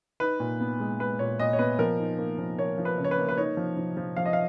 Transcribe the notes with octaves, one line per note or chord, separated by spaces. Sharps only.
D#4 B4
A#2
B3
G#3
G#3 B4
A#2 C#5
A#2 D#5
C#5
B3 B4
F3 A#4
D#4
A#3
F3
A#3 C#5
F3
B4
C#3
C#5
B4
A#3
B4
D#4 C#5
F3
F3
F3
F3 F5
D#5
F5